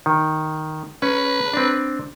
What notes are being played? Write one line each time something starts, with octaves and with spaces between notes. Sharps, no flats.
D#3
C#4 B4
C4 D4